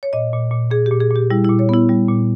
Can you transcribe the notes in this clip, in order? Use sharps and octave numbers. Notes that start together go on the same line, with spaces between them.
C#5
A#2 D#5
A#2
A#2
A#2 G#4
G4
A#2
G#4
A#2
G4
G3 E4
A#2 E4
C#5
B3 E4
G3
A#2